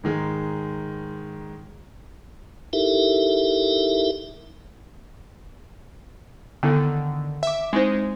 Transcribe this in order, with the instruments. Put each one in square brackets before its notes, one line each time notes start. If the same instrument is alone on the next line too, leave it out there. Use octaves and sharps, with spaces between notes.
[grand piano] G#2 D#3 G#3
[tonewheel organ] D#4 E4 G4 A4 A#4 E5
[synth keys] D3 D#3 [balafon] B3 E4 A4
[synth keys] E5 D6
[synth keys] G#3 D#4 [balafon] C4 E4 C5